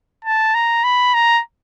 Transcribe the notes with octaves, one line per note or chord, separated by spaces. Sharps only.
A5
A#5
B5
A#5